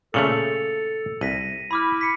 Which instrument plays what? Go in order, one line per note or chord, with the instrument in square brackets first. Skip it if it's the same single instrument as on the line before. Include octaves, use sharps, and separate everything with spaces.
[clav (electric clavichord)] A#2 C#3 A3 [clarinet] A4 [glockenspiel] C#7 F7
[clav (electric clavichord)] C2 [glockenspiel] A#6 B6 D#7
[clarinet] E4 [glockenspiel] B5 D6 F6
[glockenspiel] B6 C#7